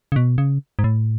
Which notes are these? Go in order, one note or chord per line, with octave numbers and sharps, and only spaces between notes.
C#3
B2
C#3
G#2
A2